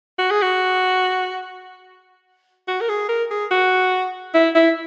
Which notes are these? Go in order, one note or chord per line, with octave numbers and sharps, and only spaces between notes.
F#4
G#4
F#4
F#4
A#4
G#4
A#4
G#4
F#4
E4
E4